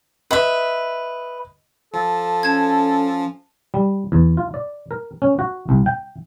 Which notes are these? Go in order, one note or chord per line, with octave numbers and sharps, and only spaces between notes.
B4 D#5 E5
F3 A4
C#4 A5 G#6
G3
E2
F4
D5
A#4
C#4
F#4
C2
G5